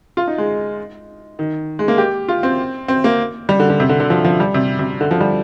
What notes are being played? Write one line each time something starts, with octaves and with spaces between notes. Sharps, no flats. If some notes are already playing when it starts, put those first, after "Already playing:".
F4
D#4
G#3
D#3
G#3
A#3
G4
F4
C4
C4
A#3
G3
D3
D3
C3
D3
D3
F3
F3
G3
C3
C3
D3
F3
G3